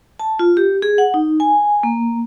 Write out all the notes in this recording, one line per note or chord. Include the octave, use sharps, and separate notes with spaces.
A5
F4
G4
G#4
F#5
D#4
G#5
A#3